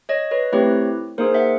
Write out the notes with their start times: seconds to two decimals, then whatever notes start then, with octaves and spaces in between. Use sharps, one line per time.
0.09 C#5 D#5
0.31 B4 C#5
0.52 A3 C4 E4 G4 B4 C#5
1.18 A#3 D#4 G#4 A#4 C5
1.34 E5 F#5